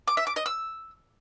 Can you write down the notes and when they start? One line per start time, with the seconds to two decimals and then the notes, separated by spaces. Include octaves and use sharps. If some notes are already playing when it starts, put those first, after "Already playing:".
0.08 D6
0.17 E5
0.27 D6
0.36 D#5
0.46 E6